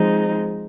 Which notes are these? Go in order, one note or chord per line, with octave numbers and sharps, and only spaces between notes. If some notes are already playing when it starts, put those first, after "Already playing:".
Already playing: F3 G#3 C4 D#4